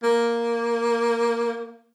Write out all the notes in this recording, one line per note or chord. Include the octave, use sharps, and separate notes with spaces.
A#3